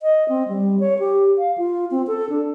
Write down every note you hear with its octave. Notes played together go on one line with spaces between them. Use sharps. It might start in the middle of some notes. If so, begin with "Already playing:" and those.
D#5
C4
G3
C#5
G4
F5
F4
C4
A4
D4